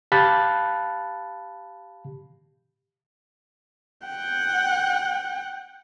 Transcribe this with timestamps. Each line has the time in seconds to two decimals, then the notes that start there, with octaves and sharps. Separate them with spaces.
0.12 G4 F5 A5 B5 F#6 A6
4.08 F#5 G5